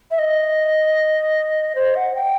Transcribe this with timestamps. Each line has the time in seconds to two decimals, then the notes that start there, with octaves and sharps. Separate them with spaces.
0.11 E5
0.18 D#5
1.75 C5
1.95 F#5
2.14 G5